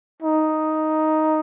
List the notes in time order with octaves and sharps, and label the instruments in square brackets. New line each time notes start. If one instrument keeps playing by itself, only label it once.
[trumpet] D#4